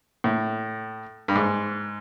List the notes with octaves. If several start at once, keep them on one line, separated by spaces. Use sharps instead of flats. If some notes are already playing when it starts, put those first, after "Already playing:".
A2
G2
G#2